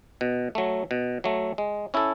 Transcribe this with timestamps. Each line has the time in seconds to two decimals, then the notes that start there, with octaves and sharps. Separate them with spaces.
0.21 B2
0.55 F#3 A3
0.91 B2
1.24 F#3 A3
1.58 G#3
1.94 C#4 E4 A4